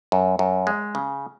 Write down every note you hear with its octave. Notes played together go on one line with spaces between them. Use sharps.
F#2
F#2
G#3
C#3